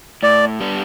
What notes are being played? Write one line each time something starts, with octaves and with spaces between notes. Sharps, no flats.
A2 D5
G3 B3 D4